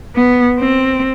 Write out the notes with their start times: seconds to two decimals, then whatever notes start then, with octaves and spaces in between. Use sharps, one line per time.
0.15 B3
0.59 C4